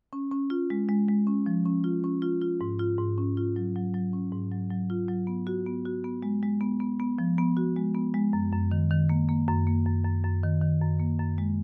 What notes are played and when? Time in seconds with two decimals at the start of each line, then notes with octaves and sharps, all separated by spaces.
0.13 C#4
0.31 C#4
0.50 F4
0.70 G#3
0.89 G#3
1.08 G#3
1.27 C#4
1.46 F3
1.65 C#4
1.84 F4
2.04 C#4
2.22 F4
2.42 F4
2.61 G#2
2.79 F4
2.98 G#2
3.18 C#4
3.37 F4
3.56 F#3
3.76 F#3
3.94 F#3
4.13 C#4
4.32 G#2
4.51 F#3
4.70 F#3
4.90 F4
5.09 F#3
5.27 B3
5.47 F#4
5.66 B3
5.85 F#4
6.04 B3
6.22 G#3
6.43 G#3
6.61 B3
6.80 B3
7.00 B3
7.18 F3
7.38 B3
7.57 F#4
7.76 G#3
7.95 B3
8.14 G#3
8.33 F#2
8.52 F#2
8.71 D#3
8.91 D#3
9.09 A#3
9.29 A#3
9.48 F#2
9.67 A#3
9.86 F#2
10.04 F#2
10.24 F#2
10.43 D#3
10.62 D#3
10.81 F#2
11.00 A#3
11.20 F#2
11.38 G#3